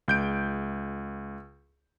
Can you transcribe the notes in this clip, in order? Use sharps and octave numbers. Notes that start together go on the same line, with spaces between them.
C#2 G6 D7